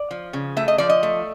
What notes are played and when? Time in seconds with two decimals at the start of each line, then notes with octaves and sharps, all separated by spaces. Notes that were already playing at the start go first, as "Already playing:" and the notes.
Already playing: D5
0.11 F3
0.33 C#3
0.57 A3 E5
0.68 D#5
0.78 F3 D5
0.90 D#5
1.03 A3